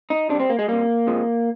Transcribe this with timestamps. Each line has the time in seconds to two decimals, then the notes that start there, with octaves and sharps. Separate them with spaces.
0.10 D#4
0.29 C3 D4
0.34 G3
0.40 C4
0.50 A#3
0.59 G#3
0.68 C3 G3 A#3
1.07 C3 F3 G#3